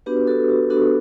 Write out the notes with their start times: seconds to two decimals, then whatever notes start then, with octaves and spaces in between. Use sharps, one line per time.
0.06 B3 D4 F#4 G4 B4
0.27 F#4 A4
0.49 F#4
0.70 B3 D4 F#4 A4